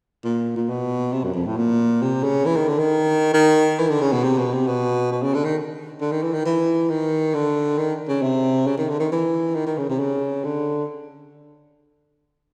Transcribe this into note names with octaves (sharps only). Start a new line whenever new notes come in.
A#2
A#2
B2
C3
F#2
F2
A2
A#2
C3
C#3
E3
D#3
D3
D#3
D#3
E3
D3
C#3
B2
C3
B2
C3
B2
B2
C#3
D3
D#3
D3
D#3
E3
D#3
E3
D#3
D3
D#3
C#3
C3
C#3
D#3
D3
D#3
E3
D#3
D#3
C#3
C3
C#3
D3